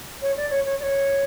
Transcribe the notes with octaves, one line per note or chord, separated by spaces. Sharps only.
C#5
D5
C#5
C#5
D5
C#5